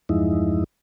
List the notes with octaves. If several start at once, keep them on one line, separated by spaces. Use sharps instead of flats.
E2 G2 F3 G#3 D#4 E4